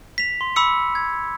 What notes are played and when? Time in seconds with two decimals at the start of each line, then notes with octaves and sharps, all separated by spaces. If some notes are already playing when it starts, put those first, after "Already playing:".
0.18 B6 F7
0.41 C6
0.56 B5 D6 E6 C#7
0.95 G#6